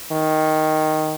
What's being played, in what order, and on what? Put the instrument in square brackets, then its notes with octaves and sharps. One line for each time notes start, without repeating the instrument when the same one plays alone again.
[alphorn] D#3